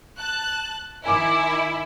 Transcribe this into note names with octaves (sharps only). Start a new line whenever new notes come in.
A5 F#6
D#3 E4 G#5 D6